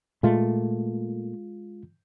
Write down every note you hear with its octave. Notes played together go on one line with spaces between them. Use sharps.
A#2 G#3 A3 F4